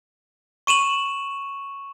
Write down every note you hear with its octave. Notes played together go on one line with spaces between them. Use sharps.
C#6 D#7 E7 F#7